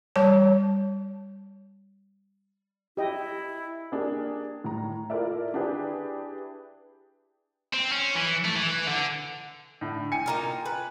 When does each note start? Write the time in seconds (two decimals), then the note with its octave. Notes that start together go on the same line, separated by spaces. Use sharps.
0.16 G3 C#5 A5
2.97 E4 G4 D#5 G5
3.92 A#3 D4 G4 G#4
4.64 A2 A#5
5.10 E4 F4 A4 A#4 D5 E5
5.54 D4 E4 G4 G#4 B4
7.73 C4
7.92 C#4
8.15 E3
8.45 A3
8.56 E3
8.88 D3
9.81 A2 D3
10.12 G5 G#5 C#7
10.26 A#3 D#4 F4
10.66 B4